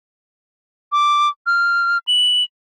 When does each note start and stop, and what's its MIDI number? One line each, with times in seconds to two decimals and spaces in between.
0.92 1.29 86
1.47 1.98 89
2.07 2.44 102